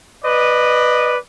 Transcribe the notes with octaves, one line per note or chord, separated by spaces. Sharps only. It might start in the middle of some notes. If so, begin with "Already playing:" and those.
B4 D5 D#5